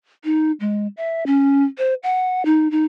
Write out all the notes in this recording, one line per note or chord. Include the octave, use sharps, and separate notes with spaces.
D#4
G#3
E5
C#4
C5
F#5
D#4
D#4